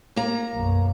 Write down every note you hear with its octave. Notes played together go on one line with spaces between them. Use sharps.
A#3 A#5
B1 F#2